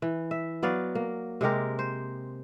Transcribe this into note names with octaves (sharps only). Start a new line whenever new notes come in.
E3
E5
F#3 B3 D5 F5
A#3
C3 G#3 G4 A#4
C5